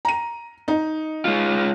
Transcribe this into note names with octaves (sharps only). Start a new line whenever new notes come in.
A#5 D#7
D#4
G#3 F4